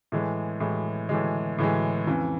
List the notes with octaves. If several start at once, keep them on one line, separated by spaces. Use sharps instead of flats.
A2 E3 G#3
A2 E3 G#3
A2 E3 G#3
A2 E3 G#3
F2 C#3 E3